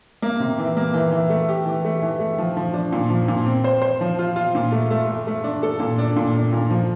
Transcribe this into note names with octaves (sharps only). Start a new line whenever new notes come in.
A#3
C3
E3
A#3
E3
E3
A3
G4
E3
A3
E3
A3
F3
F3
D4
A#2
F3
A#2
C4
C5
C5
F3
F4
F4
A#2
A3
A3
A3
A3
D4
A4
A#2
D4
A#2
D4
A#2
F3